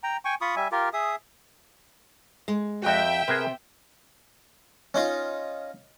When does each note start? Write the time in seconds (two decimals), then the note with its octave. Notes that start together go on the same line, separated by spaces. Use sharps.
0.03 G5 A#5
0.25 G5 G#5 C#6
0.41 F4 B5 C#6 D#6
0.56 G3 E5 G#5
0.72 F4 G4 A#4
0.93 G#4 E5 D#6
2.48 G#3
2.82 F2 F#4 E5 G5
3.28 C3 G#4 A#4 B4
4.94 C#4 D#4 F4